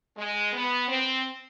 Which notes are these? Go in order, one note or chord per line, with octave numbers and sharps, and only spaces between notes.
G#3
B3
C4